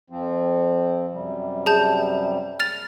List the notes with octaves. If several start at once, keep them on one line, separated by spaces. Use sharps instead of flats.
F2 F3 C4
F#2 C3 G3
G#4 A5 G6
F6 A6 F7